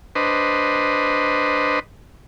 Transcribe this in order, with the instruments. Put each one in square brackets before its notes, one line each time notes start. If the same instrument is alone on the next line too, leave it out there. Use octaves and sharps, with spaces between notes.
[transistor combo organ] D4 B4 C5 D#5